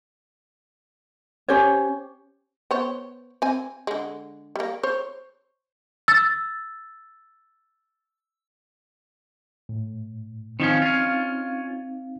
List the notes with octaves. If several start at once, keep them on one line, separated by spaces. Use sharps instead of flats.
C#4 G4 C5 C#5
B3 C5 C#5
C4 G#5
D3 G#3
G3 A#3
C5 C#5
E6 A6
A2
D#3 F3 C4 C#4 D#4 F5
C#4 F4